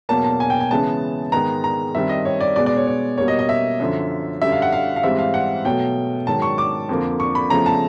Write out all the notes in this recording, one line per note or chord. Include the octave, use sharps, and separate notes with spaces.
E2 B2 F#3 A#3 A5
A5
G#5
G5
G#5
C#3 E3 G#3 B3 A5
G#2 D#3 G#3 B3 A#5
A#5
G2 D#3 G3 C4 E5
D#5
C#5
D5
B2 G#3 B3 D5
D5
C#5
C#5
B2 G3 A#3 C#5
D#5
D#5
E5
F#2 D3 F3
F#2 D3 G3 E5
F5
F#5
F5
F5
G#2 E3 G3 C4 E5
F5
F#5
B2 F#3 A3 G5
G#2 D#3 F#3 A5
C#6
D6
F2 D3 F3 A#3
C#6
B5
E2 C#3 F3 A3 A#5
A5